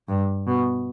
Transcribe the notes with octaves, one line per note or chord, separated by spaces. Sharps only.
G2
B2